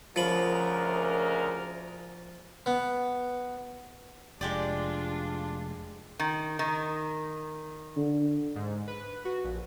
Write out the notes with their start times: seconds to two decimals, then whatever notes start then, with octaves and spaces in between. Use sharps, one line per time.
0.16 D2 C#3 F3 A#4 B5
2.66 B3
4.41 F1 G#3 D4 F4 G4 D5
6.19 D#3
6.59 D#3
7.97 D3
8.56 G#2
8.88 B4
9.25 F#4
9.44 A#1